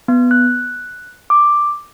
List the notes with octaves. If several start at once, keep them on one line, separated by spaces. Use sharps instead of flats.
B3
F#6
D6